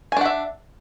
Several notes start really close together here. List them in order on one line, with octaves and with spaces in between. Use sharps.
G#5 D4 F#5 E5